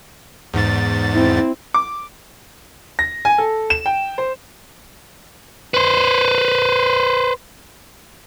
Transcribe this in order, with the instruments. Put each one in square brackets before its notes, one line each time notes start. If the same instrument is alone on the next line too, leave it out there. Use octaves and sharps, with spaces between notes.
[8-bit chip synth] E2 G#2 A6
[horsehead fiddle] C4 E4
[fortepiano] D6
[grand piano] A#6
G#5
A4
E7
G5
C5
[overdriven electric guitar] B4 C5